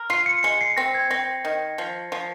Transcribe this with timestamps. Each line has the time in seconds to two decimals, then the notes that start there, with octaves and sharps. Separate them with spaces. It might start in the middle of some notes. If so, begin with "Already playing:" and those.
Already playing: A#4
0.10 F4 C7
0.26 C#7
0.43 G#3 C#7
0.61 C7
0.71 C7
0.77 C4 A#6
0.95 G#6
1.11 C4 A#6
1.45 D#3
1.78 F3
2.12 F3